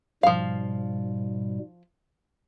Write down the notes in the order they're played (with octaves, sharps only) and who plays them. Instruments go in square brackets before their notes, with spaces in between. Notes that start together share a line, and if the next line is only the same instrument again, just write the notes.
[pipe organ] G#2 B2 G3 [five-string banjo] F3 F5